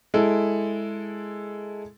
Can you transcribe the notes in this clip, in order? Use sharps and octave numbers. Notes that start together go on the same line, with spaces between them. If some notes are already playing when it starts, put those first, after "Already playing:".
G#3 E4 A4